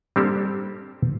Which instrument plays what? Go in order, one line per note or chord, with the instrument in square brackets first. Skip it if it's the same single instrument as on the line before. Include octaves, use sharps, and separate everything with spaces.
[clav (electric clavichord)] G3 A#3 C4 D4 G4 A4